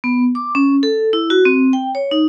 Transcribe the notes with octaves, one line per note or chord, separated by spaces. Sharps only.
B3
D6
C#4
A4
E4
F#4
C4
G5
C#5
D#4